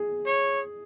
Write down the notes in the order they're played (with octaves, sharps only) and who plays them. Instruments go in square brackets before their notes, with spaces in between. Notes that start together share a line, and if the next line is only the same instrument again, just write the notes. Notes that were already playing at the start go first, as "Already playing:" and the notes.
Already playing: [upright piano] G#4
[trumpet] C#5